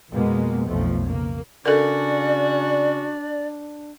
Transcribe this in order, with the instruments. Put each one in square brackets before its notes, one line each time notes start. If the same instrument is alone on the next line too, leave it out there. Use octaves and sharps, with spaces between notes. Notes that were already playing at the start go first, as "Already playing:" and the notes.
[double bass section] F2 B2 G#3 A#3 B3
B1 F2 F3 A3
C#3 A#3
[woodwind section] C#3 C#4 F#4 [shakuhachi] D4 [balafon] A4 A#4 [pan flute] D5